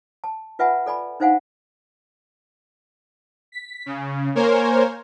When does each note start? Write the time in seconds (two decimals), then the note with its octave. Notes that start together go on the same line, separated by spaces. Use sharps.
0.24 A5
0.59 F4 B4 E5 F#5 G#5 B5
0.86 A4 D5 G#5 B5
1.20 D4 D#4 C5 F5 F#5 G#5
3.52 B6
3.86 C#3
4.35 A#3 A#4 C5 C#5 G#5